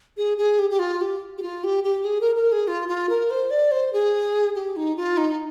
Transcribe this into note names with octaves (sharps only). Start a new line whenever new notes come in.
G#4
G#4
G4
G4
F4
G4
G4
F4
G4
G4
G#4
A#4
A#4
G#4
F4
F4
A#4
C5
D5
C5
G#4
G4
D#4
F4
D#4